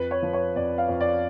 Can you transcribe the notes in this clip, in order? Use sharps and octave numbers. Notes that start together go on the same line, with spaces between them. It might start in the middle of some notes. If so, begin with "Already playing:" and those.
Already playing: F2 B4
C#5
F3
C#5
F2 D5
F5
F2
D5